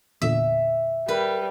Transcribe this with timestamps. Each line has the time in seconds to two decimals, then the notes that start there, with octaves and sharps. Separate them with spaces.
0.22 E2 A#2 D3 E5
1.08 G3 A#4 B4